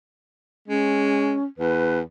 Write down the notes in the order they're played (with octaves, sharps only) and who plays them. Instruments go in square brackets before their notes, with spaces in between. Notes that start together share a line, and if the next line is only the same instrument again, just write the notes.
[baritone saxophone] G#3 [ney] C#4
[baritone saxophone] E2 [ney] B4